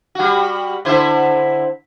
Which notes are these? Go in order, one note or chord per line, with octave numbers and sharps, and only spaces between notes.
G3 F#4
D3 E4 C5